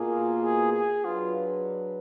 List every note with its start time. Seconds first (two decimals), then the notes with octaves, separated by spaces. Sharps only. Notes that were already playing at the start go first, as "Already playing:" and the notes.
Already playing: B2 A#3 F4 G#4
0.41 G#4
0.73 G#4
1.05 F#3 D4 F4 G#4 B4